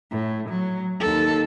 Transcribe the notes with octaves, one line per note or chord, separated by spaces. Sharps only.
A2
F#3
D#2 A4